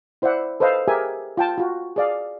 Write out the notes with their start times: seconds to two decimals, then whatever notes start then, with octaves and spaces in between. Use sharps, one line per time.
0.22 E4 C5 D5 E5 F#5
0.60 A4 B4 C5 D#5 F5
0.87 G4 G#4 A#4 E5 G#5
1.37 F4 G5 A5
1.58 F4 F#4
1.96 G#4 D5 F5